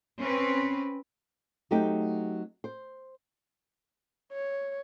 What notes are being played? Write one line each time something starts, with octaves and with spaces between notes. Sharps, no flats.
C4 C#4 B4
F#3 A3 C4 D#4 G4
C5
C#5